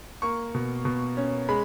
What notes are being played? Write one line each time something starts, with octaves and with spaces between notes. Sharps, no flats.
A#3 C#6
B2
B2
C#4
G#3 B5